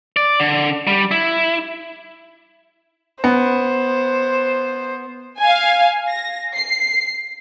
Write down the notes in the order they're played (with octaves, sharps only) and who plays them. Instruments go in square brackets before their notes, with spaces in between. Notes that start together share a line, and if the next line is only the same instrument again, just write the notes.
[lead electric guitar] D5
D3
G3
E4
[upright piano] B3 [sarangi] C5
[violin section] F5 G#5
A#6
C7